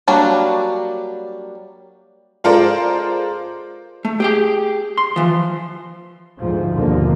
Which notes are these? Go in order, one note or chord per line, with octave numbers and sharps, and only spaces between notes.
F#3 G3 A#3 D4 F#4
G#3 F4 A4 A#4 C5 D5
A3
G4 G#4 G5
C6
E3 F3
D2 G#2 F3
A1 D#2 B2 D3 F3 A#3